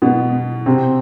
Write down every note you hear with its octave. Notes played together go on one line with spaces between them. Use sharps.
B2 B3
C3 C4